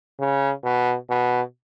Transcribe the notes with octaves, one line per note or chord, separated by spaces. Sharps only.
C#3
B2
B2